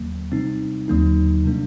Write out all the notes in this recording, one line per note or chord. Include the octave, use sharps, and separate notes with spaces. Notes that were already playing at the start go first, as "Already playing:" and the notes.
Already playing: D#2 D3 F#3 A#3
C3 G3 C4 D#4
D#2 D3 F#3 A#3 D#4
C3 G3 A#3 D4